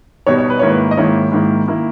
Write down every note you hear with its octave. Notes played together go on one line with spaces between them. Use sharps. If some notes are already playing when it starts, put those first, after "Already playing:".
B2 G3 B3 D#4 C#5
C#5
B4
G#2 D#3 A#3 E4 C#5
B4
D#5
G#2 D#3 A#3 E4 C#5
G#2 D#3 A#3 E4
D#3 A#3 E4